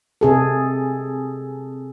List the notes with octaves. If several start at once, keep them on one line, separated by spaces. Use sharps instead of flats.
C3 G#4 A4